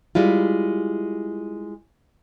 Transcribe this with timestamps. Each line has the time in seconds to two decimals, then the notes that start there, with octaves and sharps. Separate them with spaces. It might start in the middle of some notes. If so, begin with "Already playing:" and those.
0.15 G3 G#3 E4 F4